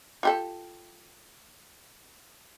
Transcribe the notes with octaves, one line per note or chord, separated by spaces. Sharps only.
F4 G4 A4